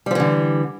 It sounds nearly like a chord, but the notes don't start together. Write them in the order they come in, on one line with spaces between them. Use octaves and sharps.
G3 F3 E3 D3